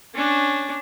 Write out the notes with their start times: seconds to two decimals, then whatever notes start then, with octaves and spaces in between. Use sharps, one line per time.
0.14 C#4 D4